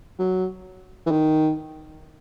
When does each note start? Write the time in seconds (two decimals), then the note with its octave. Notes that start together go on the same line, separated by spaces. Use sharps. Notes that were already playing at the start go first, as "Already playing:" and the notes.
0.19 F#3
1.06 E3
1.11 D#3